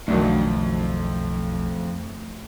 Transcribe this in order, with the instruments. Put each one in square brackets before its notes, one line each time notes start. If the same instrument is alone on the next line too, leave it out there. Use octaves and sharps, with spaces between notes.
[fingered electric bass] B1 [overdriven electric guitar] F2 [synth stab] D#3 F#3 D4 [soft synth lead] A3